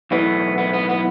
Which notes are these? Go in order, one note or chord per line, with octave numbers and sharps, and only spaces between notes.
B1 A2 E3 B3
B3
B3
B3